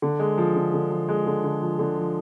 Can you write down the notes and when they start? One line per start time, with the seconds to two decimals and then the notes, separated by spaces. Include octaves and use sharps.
0.02 D3
0.19 G#3
0.38 F3
0.56 D3
0.74 D3
0.91 F3
1.09 G#3
1.26 D3
1.44 D3
1.62 F3
1.79 D3
1.98 F3